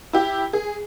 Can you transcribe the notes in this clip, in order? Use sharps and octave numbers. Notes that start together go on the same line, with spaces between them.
E4 G4
G#4